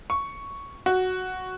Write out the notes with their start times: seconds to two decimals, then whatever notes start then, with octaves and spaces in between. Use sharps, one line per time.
0.10 C#6
0.86 F#4